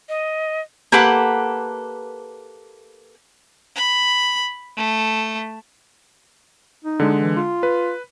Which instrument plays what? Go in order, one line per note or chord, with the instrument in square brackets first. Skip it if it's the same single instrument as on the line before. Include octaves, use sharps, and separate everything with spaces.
[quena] D#5
[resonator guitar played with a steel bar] A#3 G4 A4 B4 F#5
[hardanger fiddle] B5
A3
[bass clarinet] D#4
[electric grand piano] D3 G#3
[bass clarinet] E3
F4
[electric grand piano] B4